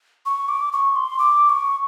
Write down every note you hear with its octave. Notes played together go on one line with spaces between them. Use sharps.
C#6
D6
C#6
C6
D6
C#6